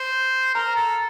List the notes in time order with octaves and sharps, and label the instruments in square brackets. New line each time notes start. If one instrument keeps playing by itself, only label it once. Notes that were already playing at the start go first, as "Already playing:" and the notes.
Already playing: [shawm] C5
[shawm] A#4 [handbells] A#5
[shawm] A4